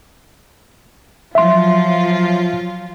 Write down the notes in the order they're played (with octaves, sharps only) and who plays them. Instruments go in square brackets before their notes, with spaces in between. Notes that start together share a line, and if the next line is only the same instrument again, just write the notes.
[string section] F3 F#3 F4 [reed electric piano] E5 C6